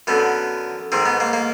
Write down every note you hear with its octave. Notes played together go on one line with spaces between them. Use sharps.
F#2 D3 B3
G#2 D#3 C4
B3
A#3
A#3